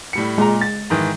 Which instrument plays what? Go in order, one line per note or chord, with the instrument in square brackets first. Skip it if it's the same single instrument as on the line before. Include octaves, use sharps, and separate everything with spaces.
[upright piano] A2 G3 C#7
[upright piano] A#2 A#5 [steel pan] G#3
[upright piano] A6
G#2 D#3 E3